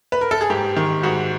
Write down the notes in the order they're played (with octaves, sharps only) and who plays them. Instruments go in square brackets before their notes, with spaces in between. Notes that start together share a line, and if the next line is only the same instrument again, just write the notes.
[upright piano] B4
A#4
A4
G#4
G#2 G4
D#3
G#2 F#4